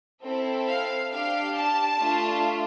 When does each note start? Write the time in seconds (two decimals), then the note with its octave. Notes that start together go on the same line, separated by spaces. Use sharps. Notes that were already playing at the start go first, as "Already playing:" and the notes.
0.23 C4 E4 A4
0.67 F5
1.11 D4 G4 F5
1.55 A5
1.99 A3 D4 F4